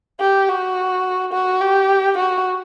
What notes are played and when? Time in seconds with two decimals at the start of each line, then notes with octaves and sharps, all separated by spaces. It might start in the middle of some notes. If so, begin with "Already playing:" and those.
0.20 G4
0.49 F#4
1.33 F#4
1.61 G4
2.18 F#4